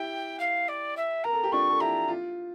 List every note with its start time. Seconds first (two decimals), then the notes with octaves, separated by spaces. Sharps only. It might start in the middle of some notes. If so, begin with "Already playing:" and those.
Already playing: E4 G4 G5
0.39 F5
0.68 D5
0.97 E5
1.24 A#4 A#5
1.33 A4
1.43 G4
1.52 D4 F4 C#6
1.70 A4
1.80 E4 G4 A#5
2.08 F4